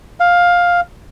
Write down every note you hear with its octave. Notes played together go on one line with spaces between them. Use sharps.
F5